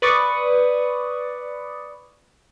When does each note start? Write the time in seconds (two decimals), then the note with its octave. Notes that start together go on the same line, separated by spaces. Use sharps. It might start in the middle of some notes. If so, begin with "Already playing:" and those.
0.02 B4 D5 C#6 D#6